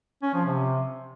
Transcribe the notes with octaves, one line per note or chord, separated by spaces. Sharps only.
C#4
F3
C3